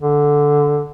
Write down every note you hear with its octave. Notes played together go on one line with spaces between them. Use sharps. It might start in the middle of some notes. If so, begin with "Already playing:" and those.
D3